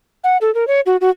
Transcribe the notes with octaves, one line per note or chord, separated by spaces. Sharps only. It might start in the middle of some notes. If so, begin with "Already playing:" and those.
F#5
A4
A#4
C#5
F#4
F#4